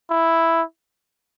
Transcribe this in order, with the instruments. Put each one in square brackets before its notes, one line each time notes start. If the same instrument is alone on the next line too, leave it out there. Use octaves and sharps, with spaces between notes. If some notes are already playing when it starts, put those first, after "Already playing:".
[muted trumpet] E4